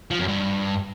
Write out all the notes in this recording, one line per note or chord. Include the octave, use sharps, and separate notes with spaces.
F3
F#2
G2